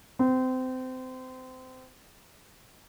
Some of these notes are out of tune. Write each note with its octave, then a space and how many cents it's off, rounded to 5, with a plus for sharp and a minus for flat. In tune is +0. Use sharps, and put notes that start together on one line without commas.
C4 -25